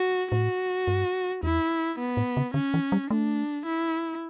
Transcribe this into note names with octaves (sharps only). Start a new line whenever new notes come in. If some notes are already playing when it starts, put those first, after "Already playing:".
Already playing: F#4
A2 F#4
G2
E2 E4
B3
A2
C#3
D3 C#4
E3
G3
A3 D4
E4